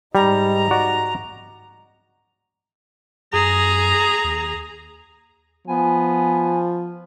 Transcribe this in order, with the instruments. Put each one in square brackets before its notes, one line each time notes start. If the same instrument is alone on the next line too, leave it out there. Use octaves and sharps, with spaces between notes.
[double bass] G#2 D#4 [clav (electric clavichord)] G3 [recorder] A#5
[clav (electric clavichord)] F#4 D5
[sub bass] F#2 [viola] G#4 A#5
[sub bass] D#2
[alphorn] F3 [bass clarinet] B3 [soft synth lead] G#5